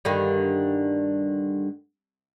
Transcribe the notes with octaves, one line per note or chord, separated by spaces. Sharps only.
G2 D3 D#3